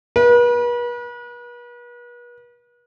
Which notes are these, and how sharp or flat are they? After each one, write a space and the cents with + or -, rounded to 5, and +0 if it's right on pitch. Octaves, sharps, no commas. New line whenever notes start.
B4 -40